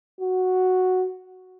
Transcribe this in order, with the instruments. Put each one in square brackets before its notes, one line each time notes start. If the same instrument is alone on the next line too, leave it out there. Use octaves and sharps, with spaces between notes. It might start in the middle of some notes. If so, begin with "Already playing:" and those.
[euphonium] F#4